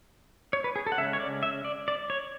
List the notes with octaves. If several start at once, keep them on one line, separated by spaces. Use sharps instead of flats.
C#5
B4
G#4
A4
F#5
C#3 G#3 C#4 E5
C#5
D5
E5
D5
D5
C#5